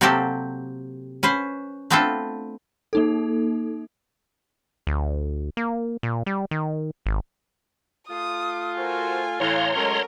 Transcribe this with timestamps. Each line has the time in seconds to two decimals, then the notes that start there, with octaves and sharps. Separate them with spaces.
0.01 C3 F#3 A#3 C4 G4 A4
1.23 C#4 B4 C5
1.90 A3 B3 C4 D4 F4 A4
2.93 A#3 D#4 A4
4.87 D2
5.57 A#3
6.03 A#2
6.26 G3
6.51 D#3
7.06 G#1
8.09 A3 F4 D#6
8.77 F#4 A#4 C5 G#5
9.40 A2 E3 C#5 F5 A#5 C6
9.75 F#3 G#3 A3 C#4 A#4